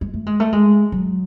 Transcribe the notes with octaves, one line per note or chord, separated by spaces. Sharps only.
G#3
A3
G#3
A3
G#3
F#3